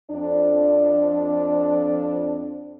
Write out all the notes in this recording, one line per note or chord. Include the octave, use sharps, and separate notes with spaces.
F2 D4